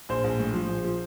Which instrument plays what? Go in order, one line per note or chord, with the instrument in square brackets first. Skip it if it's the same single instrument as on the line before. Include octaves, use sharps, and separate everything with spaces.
[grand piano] A#1 C5
A#1
A2
F3
A#1
F3